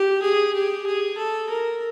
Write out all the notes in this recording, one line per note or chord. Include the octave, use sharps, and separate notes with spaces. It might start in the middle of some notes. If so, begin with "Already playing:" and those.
Already playing: G4
G#4
G4
G#4
A4
A#4